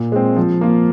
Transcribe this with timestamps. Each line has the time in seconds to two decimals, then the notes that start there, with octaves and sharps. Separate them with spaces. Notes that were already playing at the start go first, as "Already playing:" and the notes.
Already playing: A#2
0.12 G#3 C4
0.36 F3
0.61 A#3 F4